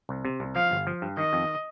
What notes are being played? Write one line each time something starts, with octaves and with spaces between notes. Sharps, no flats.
C2
C3
C2
F3 F5
G1
F3
G2
D#3 D#5
F2